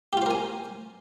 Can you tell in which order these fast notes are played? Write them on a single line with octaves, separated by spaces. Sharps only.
G4 F4 C5 A#4 G#5